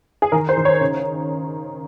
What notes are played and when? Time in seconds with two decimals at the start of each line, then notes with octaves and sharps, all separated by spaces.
0.22 G#4
0.32 D#3 A#4
0.49 C5
0.57 D#3
0.65 C#5
0.81 C#3